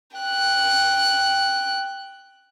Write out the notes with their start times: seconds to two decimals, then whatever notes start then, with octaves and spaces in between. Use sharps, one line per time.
0.17 G5 F#6